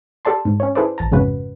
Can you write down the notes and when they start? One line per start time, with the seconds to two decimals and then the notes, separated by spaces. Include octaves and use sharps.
0.25 G4 A4 D5 A5 C6
0.45 G#2
0.60 C#4 C#5
0.75 E4 G#4 A4 B4 C5 D5
0.98 A1 A5 A#5
1.11 F2 G#2 C#3 C#4 F#4 B4